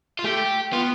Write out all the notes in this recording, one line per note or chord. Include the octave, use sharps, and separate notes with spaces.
F4
A3 G4
B3 F4